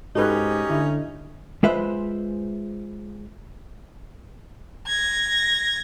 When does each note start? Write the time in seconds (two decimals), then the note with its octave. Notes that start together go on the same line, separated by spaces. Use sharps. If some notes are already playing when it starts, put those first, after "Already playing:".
0.16 G#2 C#4 D#4 F#4 G4 A4 B4
0.70 D3 E4
1.63 G#3 F4 B4 C5 E5
4.87 G#6 A#6